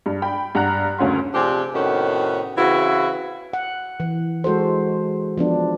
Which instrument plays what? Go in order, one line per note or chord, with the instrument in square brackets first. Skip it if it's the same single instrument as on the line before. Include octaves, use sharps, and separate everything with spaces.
[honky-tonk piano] G2
G5 B5
G2 F#5 A#5 F#6
F#1 D2 C#4 F#5 C6
[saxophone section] C3 F3 C4 D4 G4 G#4
A2 C3 D#3 B3 C#4 F#4
C#3 E3 C4 E4 F#4
[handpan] F#5
E3
G#3 F#4 A4 C5
F3 B3 D4